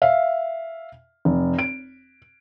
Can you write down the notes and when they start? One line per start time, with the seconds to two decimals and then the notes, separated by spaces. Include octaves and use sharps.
0.02 E5 F5
1.25 F1
1.59 D7